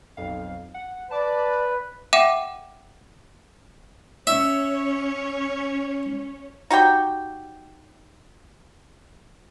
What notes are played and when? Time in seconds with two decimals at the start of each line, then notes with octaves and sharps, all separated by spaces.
0.17 B1 F2 F5
0.74 F#5
1.11 B4 D5 A5 D6
2.13 E5 F#5 G5 D6 D#7 E7
4.27 C#4 C#5 E5
6.70 D#4 F#4 G4 G5